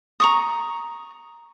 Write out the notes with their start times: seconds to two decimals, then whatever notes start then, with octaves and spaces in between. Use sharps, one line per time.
0.20 A#5 C#6 D#6